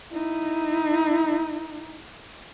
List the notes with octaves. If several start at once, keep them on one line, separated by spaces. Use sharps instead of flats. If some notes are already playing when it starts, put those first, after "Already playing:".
D#4 E4